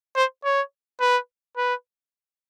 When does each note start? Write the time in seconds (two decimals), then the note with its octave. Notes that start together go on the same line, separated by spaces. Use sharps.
0.16 C5
0.44 C#5
1.01 B4
1.57 B4